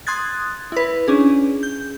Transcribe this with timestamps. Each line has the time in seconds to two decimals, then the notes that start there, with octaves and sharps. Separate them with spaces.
0.07 C6 D#6 F#6 G#6 A6
0.72 E4 B4
1.08 C#4 D4 G#4
1.63 G6